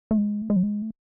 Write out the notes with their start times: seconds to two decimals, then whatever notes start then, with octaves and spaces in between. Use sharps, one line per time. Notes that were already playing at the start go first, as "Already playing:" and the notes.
0.11 A3
0.18 G#3
0.42 A3
0.50 G#3
0.56 F#3
0.63 G#3
0.82 A3